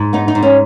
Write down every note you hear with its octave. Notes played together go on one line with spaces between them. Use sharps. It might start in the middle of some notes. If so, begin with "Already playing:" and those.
Already playing: G#2
B3 D#4
D#4
G#2
C#4